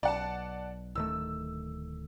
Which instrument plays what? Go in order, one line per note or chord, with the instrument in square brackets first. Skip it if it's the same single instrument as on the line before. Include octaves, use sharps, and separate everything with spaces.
[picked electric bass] B1 [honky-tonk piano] D5 F#5 A5
[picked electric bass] D1 D#3 A3 [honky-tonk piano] E6